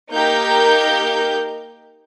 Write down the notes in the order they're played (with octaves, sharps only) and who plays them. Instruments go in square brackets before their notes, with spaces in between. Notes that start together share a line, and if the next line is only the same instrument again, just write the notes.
[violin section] A#3 D#4 G4 A#4 G6